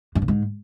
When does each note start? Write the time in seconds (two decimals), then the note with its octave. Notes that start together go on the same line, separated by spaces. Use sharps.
0.15 G2
0.22 A#2
0.28 G#2